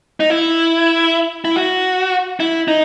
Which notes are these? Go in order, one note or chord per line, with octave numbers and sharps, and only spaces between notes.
D#4
E4
E4
F#4
E4
D#4